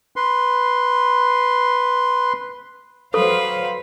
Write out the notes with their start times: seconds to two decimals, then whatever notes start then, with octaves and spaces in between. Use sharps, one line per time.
0.16 B4 C6
3.14 F#3 A4 B4 C5 F5